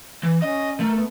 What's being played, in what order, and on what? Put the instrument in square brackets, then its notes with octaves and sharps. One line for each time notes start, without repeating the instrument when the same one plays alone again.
[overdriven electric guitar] E3
[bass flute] C#4 [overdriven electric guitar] D#5
[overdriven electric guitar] A3 [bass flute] A#4
[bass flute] B3